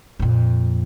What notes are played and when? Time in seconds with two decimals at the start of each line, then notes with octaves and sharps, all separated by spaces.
0.19 F2 A#2